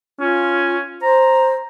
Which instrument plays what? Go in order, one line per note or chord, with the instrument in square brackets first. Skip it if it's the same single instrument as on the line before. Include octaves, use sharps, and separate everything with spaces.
[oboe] C#4 [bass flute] F4
[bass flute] C5 [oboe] A#5